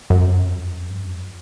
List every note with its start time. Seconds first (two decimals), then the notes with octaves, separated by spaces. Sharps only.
0.10 F#2
0.45 F2
0.90 G2
1.02 F#2
1.15 F2